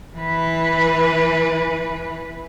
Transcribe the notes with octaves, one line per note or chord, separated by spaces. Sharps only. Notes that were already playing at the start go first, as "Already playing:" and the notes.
E3 B4